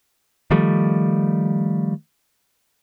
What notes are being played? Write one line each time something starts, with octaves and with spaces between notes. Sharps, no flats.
D#3 F3 G3 A3